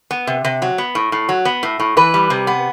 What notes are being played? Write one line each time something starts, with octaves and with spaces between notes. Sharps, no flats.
B3
C3
C3
F#3
B3
A2
A2
F#3
B3
A2
A2
E3 B4
G3
C3
B3